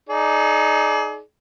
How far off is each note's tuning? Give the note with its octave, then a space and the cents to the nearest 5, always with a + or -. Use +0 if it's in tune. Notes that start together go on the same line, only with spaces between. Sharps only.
D#4 +0 G#4 +35 D5 -10